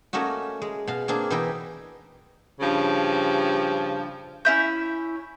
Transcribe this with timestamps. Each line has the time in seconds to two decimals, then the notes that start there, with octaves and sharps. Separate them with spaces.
0.13 A3 A#3 C#4 D#4 F#4
0.62 G#3
0.88 B2 F5
1.08 A#3 C4 D4 G#4
1.30 B2 E3 D#4 E4 B4 G5
2.61 G2 C#3 F3
4.45 C#4 E4 G6